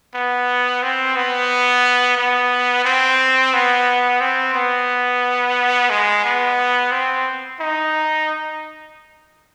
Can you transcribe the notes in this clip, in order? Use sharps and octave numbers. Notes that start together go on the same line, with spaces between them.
B3
C4
B3
B3
C4
B3
C4
B3
G#3
B3
C4
D#4